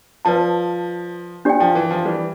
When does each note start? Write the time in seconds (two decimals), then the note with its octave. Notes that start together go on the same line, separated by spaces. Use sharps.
0.25 F3 B4 D5 A5
1.45 D4 G4 D5 G5
1.60 F3
1.75 E3
1.90 F3
2.05 E3 G3